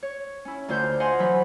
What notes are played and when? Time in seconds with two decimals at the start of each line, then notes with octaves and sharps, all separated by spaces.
0.03 C#5
0.45 C#4 E4
0.68 D2 D3 F4 C5 G6
1.00 C5 D#5 F5 F#5 G#5 C6
1.19 E3 F#3 B5 C#6